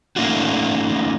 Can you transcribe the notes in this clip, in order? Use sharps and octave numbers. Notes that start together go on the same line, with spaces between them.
A3 A#3 C#4 D#4 F4 F#4